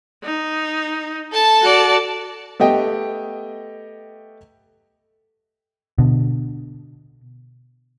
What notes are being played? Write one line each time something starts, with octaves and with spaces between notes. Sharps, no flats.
D#4
A4 A5
F#4 D5
A3 B3 G4 D#5 G5
B2 D3